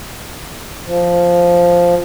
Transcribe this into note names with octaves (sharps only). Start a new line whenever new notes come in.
F3